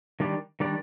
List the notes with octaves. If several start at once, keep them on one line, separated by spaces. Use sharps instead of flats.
D#3 G3 D4 G4 D5
D#3 G3 D4 G4 D5